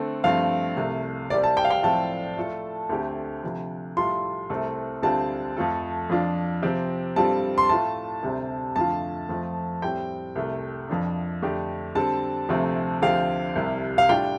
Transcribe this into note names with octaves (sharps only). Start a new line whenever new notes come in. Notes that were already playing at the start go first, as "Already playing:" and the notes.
Already playing: D3 A3 C4 A4
G2 F3 A3 C4 F5
C2 C3 A3
C2 C3 G3 C4 D5
A5
G5
F5
G5
A2 F3 C4 A4 A5
A2 A3 F4 A4
D2 D3 A3 C4 G4
D2 C3 F3
A2 G3 F4 A4 C6
C2 C3 A3 C4 A4
D2 D3 G3 C4 F4 A5
F2 F3 A3 F4 A4
F2 F3 D4 F4
C3 F3 C4 G4
G2 G3 C4 F4 A4 A5
C6
A2 A3 F4 A5
D2 C3 G3 C4
F2 D3 A3 F4 A5
F2 F3 A3 C4
A2 G3 C4 G5
C2 C3 A3
F2 F3 D4
F2 D3 A3 D4 G4
D3 G3 C4 A4 A5
D2 C3 F3 A3 C4
D2 D3 F3 C4 G4 F5
C2 C3 G3
F5
A2 G3 D4 F4 G5